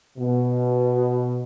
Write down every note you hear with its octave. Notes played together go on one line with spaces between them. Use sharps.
B2